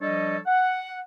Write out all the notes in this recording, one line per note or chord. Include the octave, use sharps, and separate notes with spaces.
F3 G3 D4 A4 C#5 D#5
F#5